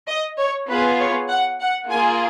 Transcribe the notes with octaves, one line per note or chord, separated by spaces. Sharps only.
D#5
C#5
B3 F4 G#4 B4
C#5
F#5
F#5
A#3 F4 G#4 G#5